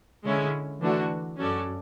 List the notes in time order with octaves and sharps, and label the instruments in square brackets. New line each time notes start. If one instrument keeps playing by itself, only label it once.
[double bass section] D3 [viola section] G#3 C#4 E4
[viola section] D3 A3 D4 F#4 [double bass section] E3
[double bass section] F#2 [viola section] C#4 F#4 A4 D5